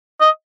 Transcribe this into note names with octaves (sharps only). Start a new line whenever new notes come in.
D#5